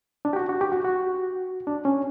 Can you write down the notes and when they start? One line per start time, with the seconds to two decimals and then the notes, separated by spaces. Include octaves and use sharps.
0.25 D4
0.33 G4
0.36 F#4
0.49 F#4
0.61 G4
0.72 F#4
0.84 F#4
1.67 D4
1.85 C#4